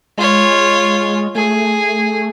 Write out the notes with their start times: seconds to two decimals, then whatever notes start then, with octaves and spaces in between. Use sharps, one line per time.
0.18 G#3 F4 C#5
1.35 A3 G#4